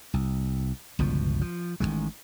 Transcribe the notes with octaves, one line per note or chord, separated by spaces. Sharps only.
C2
G1 C#2 B2 F3
F3
A1 C3 D#3 G#3